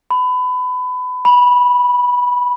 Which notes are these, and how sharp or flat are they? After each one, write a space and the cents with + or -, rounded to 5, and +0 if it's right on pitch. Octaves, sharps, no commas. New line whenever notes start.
B5 +25
B5 -10